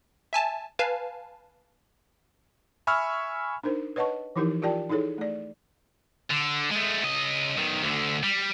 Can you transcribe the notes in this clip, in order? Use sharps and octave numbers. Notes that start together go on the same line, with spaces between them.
E5 G#5 A5
B4 F5 G#5 A5
E5 G#5 B5 C#6 E6 F6
D4 D#4 A#4 C5
B4 C#5 D#5 F#5 A5 C#6
E3 F3 D#4 E4 G4 A#4
F4 G4 A#4 D5 G5 A5
D#4 E4 G#4 A4 C#5
A3 D5
D3
G#3 A3
C#3 D#5
B1 D#3
D2 D3
G3